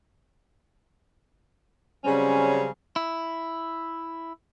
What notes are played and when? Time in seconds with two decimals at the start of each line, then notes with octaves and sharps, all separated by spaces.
2.05 C#3 F#3 G3 C4 C#4
2.96 E4